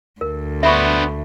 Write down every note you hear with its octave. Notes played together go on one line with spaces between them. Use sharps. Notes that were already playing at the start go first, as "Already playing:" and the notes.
D2 A#4
B3 D4 C5 E5 B5 C#6